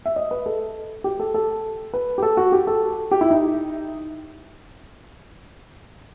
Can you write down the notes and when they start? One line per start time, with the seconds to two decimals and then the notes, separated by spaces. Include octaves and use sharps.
0.06 E5
0.16 D#5
0.31 B4
0.46 A4
1.04 G4
1.20 A4
1.34 A4
1.94 B4
2.18 G4
2.23 A4
2.37 F#4
2.52 G4
2.67 A4
3.11 G4
3.21 E4
3.30 D#4